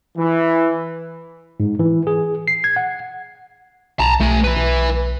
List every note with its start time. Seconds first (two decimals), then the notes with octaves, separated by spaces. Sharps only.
0.16 E3
1.60 G#2
1.79 E3
2.07 G#4
2.48 C7
2.64 G#6
2.76 F#5
4.00 B1 A5 A#5
4.20 B1 A3 G#5
4.44 E4 B4
4.56 B1